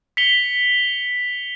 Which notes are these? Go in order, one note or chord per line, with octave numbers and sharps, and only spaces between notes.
B6 C#7 F7 G7